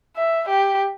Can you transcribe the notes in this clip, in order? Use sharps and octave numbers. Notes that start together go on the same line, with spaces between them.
E5
G4